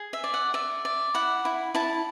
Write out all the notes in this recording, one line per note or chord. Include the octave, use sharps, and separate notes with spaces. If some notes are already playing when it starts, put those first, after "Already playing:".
Already playing: G#4
E5
D5
F#5
D5 E5
D5
E4 F#5
E4
E4 A5